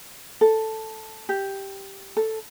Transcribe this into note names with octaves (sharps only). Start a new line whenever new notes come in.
A4
G4
A4